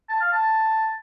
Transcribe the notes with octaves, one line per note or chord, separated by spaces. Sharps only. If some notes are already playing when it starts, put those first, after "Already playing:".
A5
F5
A5